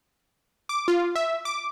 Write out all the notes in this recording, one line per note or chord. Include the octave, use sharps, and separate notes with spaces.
D6
F4
E5
D6